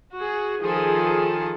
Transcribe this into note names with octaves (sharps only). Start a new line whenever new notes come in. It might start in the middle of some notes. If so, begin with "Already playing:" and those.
F#4 G#4
D#3 F3 G#4 A4